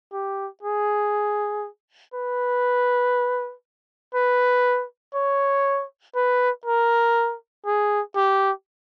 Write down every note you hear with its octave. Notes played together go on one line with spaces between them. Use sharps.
G4
G#4
B4
B4
C#5
B4
A#4
G#4
G4